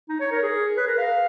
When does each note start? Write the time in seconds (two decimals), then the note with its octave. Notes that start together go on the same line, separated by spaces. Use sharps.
0.09 D#4
0.20 C#5
0.31 A#4
0.43 G#4
0.77 B4
0.87 A#4
0.98 F5